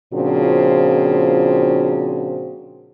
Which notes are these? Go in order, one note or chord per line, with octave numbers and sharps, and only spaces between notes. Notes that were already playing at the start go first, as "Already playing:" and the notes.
A#2 C#3 F3 C4 D4 F#4